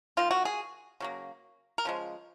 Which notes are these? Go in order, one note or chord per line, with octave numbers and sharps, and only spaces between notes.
D#3 A#3 F4
F#4
G#4
C#3 F#3 A#3
A#4
C#3 F3 G#3